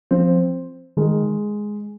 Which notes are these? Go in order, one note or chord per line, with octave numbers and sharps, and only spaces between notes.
F3 C4
D#3 G#3